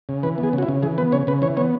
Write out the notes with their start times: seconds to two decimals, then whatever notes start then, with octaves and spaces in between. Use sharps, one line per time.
0.09 C#3
0.23 E3 B4
0.38 B3
0.43 G#4
0.53 C#3
0.58 F#4
0.62 E4
0.69 C#3
0.83 E3 G#4
0.98 B3 B4
1.12 C#3 C#5
1.27 C#3 B4
1.42 E3 C#5
1.57 B3 C#5